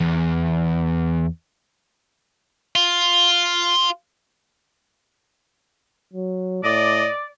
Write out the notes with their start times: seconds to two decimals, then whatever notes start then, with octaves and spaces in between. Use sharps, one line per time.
0.01 E2
2.76 F4
6.14 F#3
6.64 A2 D5 D#5